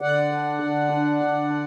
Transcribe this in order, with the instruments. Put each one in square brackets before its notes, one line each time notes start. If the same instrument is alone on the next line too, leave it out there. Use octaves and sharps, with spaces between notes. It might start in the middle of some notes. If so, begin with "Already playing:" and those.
[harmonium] D3 D5 F#5
D4
D3
D4
D3